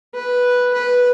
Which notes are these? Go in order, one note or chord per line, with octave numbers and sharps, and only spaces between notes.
B4
B4